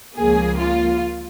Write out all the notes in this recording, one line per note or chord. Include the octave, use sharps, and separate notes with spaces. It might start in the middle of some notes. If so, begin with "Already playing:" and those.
C#2 C#3 F3 A#3 G#4
F4